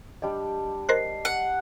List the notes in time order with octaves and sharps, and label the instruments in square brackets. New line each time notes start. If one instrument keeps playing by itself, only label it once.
[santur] G3 D4 G5 [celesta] D#5
[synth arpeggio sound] A#4 C5 F#6 [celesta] D#5 C7
[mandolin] F#5